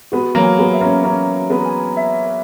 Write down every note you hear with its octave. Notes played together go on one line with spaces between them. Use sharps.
G#3 B3 F#4
F#3 A#3
G#5
G#3 B3
E5
A#3 C#4
A#3 C#4 B4
F#4
G#3 B3
G#5
E5
B4